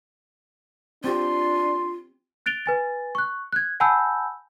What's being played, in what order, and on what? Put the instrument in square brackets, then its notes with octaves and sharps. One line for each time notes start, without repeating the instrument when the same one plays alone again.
[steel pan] C4 G4 [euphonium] D4 [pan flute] F4 [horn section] C6
[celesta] F#6 A6 D7 F7 G7
B4 G#5 A6
C#6 F#6
F#6 G#6
F#5 G#5 A5 B5 E6 G6